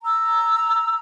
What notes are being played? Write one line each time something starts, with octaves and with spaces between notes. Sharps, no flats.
A#5 E6